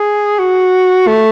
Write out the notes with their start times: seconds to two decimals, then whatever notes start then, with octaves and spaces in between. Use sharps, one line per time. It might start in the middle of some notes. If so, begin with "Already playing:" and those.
Already playing: G#4
0.39 F#4
1.07 A3